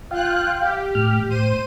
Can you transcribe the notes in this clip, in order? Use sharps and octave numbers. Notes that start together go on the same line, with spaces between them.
F4 F5 G5 F#6
G4
A2 F6
A2 C5 D#7